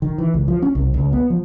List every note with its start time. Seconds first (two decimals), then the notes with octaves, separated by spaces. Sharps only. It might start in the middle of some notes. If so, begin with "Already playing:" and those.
0.02 D#3
0.18 E3
0.34 C#2
0.48 F3
0.62 C#4
0.75 C2
0.94 C#2
1.13 B3
1.30 F3